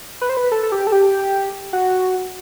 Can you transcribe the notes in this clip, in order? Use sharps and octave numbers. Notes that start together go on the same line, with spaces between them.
B4
C5
B4
A4
A4
G4
A4
G4
F#4